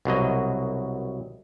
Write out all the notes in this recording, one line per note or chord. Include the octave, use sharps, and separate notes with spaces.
C2 B2 F#3 D#5